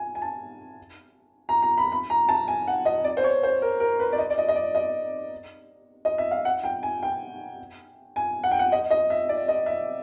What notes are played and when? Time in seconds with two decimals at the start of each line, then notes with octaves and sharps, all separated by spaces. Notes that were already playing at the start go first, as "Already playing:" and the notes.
Already playing: G#5
0.15 G#5
0.22 A5
1.49 A#5
1.63 A#5
1.78 B5
1.92 B5
2.10 A#5
2.29 A5
2.48 G#5
2.68 F#5
2.85 D#5
3.04 D5
3.17 C5
3.24 C#5
3.43 C5
3.62 A#4
3.80 A#4
4.00 B4
4.12 D5
4.18 D#5
4.30 D5
4.38 D#5
4.49 D#5
4.56 D5
4.75 D#5
6.05 D#5
6.18 E5
6.31 F5
6.45 F#5
6.64 G5
6.83 G#5
7.03 G5
8.16 G#5
8.44 F#5
8.51 G5
8.59 F#5
8.72 D#5
8.91 D#5
9.10 E5
9.29 D5
9.48 D#5
9.66 E5